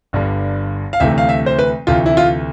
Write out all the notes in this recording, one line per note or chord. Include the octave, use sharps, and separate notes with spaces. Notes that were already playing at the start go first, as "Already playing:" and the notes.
G1 G2 D3
F5
D2 C3 E3 A3 E5
F5
E5
C5
B4
D2 C3 E3 A3 F4
E4
F4